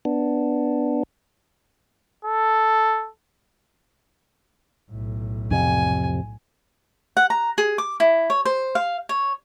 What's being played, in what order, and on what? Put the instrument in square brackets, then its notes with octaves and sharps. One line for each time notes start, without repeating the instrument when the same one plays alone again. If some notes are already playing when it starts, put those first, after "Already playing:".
[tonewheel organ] B3 D4
[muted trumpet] A4
[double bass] B1 A2
[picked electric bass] F2 C3 [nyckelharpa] G#5
[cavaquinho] F#5
A#5
G#4
D6
E4
C#5
C5
F5
C#5